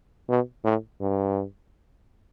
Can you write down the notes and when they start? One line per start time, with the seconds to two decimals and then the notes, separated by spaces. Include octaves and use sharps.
0.29 B2
0.64 A2
1.00 G2